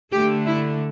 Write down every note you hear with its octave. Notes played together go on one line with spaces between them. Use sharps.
D3 A3 G4
E4